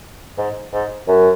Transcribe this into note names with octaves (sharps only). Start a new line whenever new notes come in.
G#2
G#2
F#2